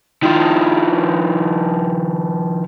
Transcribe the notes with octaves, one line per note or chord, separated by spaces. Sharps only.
D#3 F3